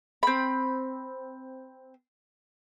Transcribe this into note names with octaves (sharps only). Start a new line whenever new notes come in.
C4 B5